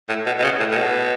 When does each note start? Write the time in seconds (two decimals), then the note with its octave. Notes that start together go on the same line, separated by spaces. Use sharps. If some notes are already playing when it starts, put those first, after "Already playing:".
0.09 A2
0.26 B2
0.39 B2
0.43 C#3
0.59 A2
0.71 A2
0.77 B2